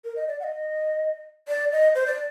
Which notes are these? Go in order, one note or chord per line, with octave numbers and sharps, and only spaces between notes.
A#4
D#5
D5
F#5
D#5
D5
D#5
C5
D5